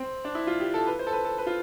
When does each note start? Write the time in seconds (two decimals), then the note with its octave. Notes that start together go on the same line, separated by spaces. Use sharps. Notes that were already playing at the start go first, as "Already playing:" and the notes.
Already playing: C4
0.25 D4
0.35 E4
0.47 F4
0.60 G4
0.74 A4
0.87 B4
0.99 C5
1.07 A4
1.13 B4
1.25 A4
1.38 B4
1.46 F4